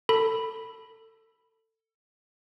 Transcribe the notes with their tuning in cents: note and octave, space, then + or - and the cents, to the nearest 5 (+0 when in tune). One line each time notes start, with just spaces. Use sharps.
A4 +25 B5 +0